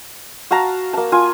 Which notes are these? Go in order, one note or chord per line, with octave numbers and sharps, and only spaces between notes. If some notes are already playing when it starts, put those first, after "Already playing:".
F#4 F5 A5 A#5
A#3 A5
F4 G#5